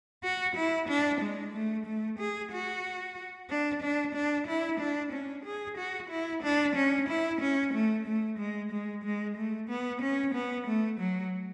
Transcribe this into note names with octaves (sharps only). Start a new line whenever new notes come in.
F#4
E4
D4
G#3
A3
A3
G#4
F#4
D4
D4
D4
E4
D4
C#4
G#4
F#4
E4
D4
C#4
E4
C#4
A3
A3
G#3
G#3
G#3
A3
B3
C#4
B3
A3
F#3